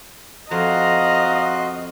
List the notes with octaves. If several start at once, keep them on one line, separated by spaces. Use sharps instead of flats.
F2 F#4 D#5 F5 A#5 C6 F#6